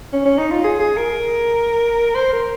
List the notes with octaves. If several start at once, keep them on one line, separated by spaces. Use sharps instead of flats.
C#4
C#4
D#4
F4
G#4
G#4
A#4
C5
A#4